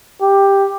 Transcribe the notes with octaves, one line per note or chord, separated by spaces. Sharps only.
G4